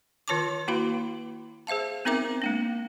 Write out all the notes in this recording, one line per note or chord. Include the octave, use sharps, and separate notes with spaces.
D#3 F4 C#5 A5 C#6 D6
A#3 E4 F#4 B4 F5 B5
G#4 C5 E5 F5 A5
B3 C4 D#4 A#4 E5 D6
G#3 A#3 D4